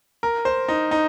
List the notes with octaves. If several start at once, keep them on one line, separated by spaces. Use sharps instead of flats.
A#4
C5
D#4
D#4